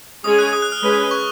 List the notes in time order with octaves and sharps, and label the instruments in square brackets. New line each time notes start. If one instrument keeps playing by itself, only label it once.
[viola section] G#3 C#4 G#4 C#5 [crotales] D#6
[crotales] F#6
D#6
F#6
F6
[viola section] G#3 C#4 G#4 B4
[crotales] C#6